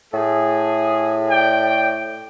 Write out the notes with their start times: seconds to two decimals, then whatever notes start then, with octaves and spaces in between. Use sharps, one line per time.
0.14 A2 A3 G#4
1.29 D5 G5